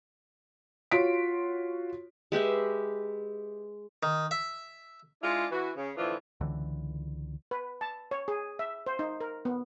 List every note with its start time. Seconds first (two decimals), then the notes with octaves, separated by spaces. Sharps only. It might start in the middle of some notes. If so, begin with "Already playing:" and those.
0.91 F4 F#4 C#5 C6 B6 D7
2.32 G#3 G4 B4 E5
4.03 D#3
4.31 E5
5.22 G#3 D4 E4 F4
5.50 E3 F#4
5.76 C#3
5.96 A2 D3 E3 F3 F4
6.41 C#2 D3 E3
7.51 B4
7.81 A5
8.11 C#5
8.28 G#4
8.59 E5
8.87 C5
8.99 D#4
9.20 A#4
9.45 B3